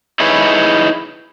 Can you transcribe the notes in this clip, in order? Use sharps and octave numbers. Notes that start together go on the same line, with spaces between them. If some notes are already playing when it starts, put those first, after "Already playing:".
D#4 E4 G#4 B4 C#5